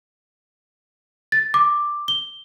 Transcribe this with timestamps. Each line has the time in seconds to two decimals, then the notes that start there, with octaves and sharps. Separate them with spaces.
1.32 A6
1.54 D6
2.08 G7